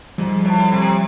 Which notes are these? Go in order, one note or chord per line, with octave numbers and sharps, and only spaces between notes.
G#2 F3 G3
A2
C3